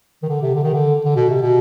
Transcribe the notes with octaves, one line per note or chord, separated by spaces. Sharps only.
D#3
D3
C3
D3
D#3
D3
D3
B2
C3
B2